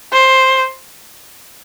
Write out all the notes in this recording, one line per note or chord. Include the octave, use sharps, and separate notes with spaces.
C5